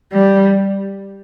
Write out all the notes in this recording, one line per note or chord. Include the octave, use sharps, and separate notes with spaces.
G3